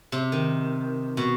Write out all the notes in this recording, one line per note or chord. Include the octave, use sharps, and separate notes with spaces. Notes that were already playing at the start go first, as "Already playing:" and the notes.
C3
D#3
B2